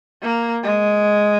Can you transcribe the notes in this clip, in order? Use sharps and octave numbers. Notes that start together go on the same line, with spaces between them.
A#3
G#3